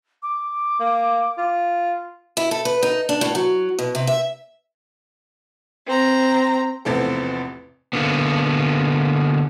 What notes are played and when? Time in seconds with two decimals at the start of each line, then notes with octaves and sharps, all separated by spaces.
0.23 D6
0.80 A#3
1.38 F4
2.37 E4
2.51 A4
2.65 B4
2.83 D#4
3.09 D4
3.21 A2
3.35 F#3
3.79 B2
3.95 C3
4.07 E5
5.86 C4 A#5
6.85 A1 E2 C3 F3 A4
7.93 D3 A#3 B3